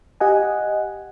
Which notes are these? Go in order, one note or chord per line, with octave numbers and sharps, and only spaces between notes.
G4 D#5 F#5 G#5